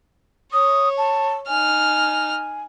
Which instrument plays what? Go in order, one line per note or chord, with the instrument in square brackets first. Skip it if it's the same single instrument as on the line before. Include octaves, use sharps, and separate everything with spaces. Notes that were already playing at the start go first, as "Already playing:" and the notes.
[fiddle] C#5 [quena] D#6
[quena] A5
[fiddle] D#4 F6 [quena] G#5